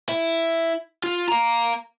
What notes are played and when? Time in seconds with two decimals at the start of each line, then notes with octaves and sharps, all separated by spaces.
0.09 E4
1.04 F4
1.28 F5 A#5